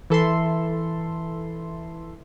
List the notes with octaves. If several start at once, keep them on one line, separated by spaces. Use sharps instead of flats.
E3 A4 E5 C6